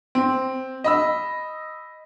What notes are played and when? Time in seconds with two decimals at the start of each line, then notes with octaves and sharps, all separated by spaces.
0.15 C4
0.84 D#5 B5 E6